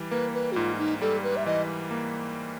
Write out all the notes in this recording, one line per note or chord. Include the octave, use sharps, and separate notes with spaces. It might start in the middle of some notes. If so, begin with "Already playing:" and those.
Already playing: E3 G3
A#3 B4
B4
F#4
G#2 F4
D#4
G3 A4
B4
E5
E3 D#5
A#3